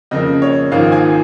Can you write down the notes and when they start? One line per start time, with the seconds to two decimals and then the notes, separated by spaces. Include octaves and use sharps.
0.11 F2 C#3 A#3 D#5
0.42 C#5
0.72 G#1 G#2 F3 A#3 F5
0.92 G#5